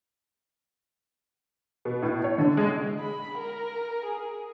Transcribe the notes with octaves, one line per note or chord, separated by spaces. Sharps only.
B2
A2
C#5
D3
G#3
B5
A#4
G#4